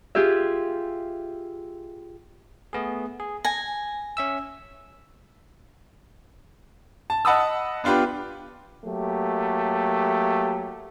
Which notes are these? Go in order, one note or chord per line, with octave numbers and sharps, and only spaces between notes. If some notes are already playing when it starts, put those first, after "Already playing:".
F4 G4 G#4 E5
A3 B3 G#4
G#4
G#5 A#6
C#4 E5 E6
A5
D#5 F#5 A5 B5 D#6 E6
B3 D4 F4 G4 B4
F#3 A3 A#3 G4